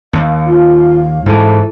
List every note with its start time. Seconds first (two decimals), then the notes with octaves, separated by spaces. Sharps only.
0.13 D#2 F5
0.46 F4
1.26 G#2 E3 E4 A4